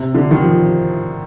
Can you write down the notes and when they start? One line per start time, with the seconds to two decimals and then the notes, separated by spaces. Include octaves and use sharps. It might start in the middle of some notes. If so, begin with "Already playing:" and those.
Already playing: C3
0.14 D3
0.31 D#3
0.42 F3